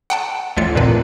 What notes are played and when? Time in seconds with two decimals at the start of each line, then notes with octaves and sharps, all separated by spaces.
0.10 F#5 G5 A5
0.57 A1 D2 E3 F4 C#7
0.75 F2 A#2 D#3 B4